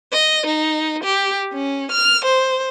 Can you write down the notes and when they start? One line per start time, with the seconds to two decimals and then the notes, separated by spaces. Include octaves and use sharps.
0.12 D#5
0.47 D#4
1.04 G4
1.54 C#4
1.91 F6
2.25 C5